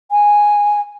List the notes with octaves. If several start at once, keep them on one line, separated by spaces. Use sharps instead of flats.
G#5